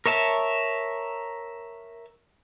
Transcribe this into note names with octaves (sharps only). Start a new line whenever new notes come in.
A#4 C#5 E5 A5